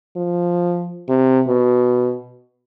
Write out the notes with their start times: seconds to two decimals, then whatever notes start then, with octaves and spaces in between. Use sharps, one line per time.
0.16 F3
1.09 C3
1.48 B2